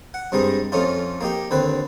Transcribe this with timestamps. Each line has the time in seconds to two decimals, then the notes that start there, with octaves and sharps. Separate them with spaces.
0.14 F#5
0.32 G2 C3 G3 G#3 D#4
0.72 F2 A3 C#4 D#4 F4
1.21 A#3 D#4 G4
1.51 D#2 D3 C4 B4